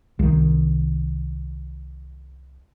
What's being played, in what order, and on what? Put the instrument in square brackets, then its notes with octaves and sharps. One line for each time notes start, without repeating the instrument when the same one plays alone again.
[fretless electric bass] C2 D#3